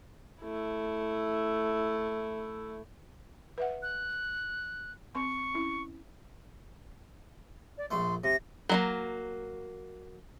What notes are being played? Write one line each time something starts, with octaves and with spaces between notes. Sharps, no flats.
A3 E4
B4 E5 F#5
F#6
C4 C6 C#6
C#4 E4
D5
A#1 A3 C6
C3 A#6
F#3 G#3 A#3